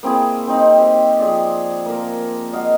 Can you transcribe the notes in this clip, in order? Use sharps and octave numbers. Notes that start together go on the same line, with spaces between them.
A#3 C4 E4 G#4
C4 D#4
G4 C5
F3 G#4 D5
A#3 A#4
D#5 F5 F#5